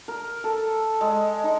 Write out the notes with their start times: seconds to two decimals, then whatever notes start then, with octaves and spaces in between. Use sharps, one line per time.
0.08 A#4
0.44 A4
1.01 G#3
1.44 D#4